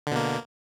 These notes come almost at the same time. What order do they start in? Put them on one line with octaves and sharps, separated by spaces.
D3 B2 A#3